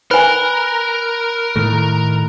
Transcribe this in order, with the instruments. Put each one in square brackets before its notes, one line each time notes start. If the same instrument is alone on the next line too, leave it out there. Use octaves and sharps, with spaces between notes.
[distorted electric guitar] A#4 [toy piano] B4 G#5 [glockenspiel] B5 F#6 G7
[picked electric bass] A2 D#3 A3